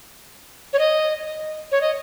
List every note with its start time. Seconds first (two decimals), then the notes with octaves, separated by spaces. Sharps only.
0.73 C#5
0.79 D#5
1.72 C#5
1.81 D#5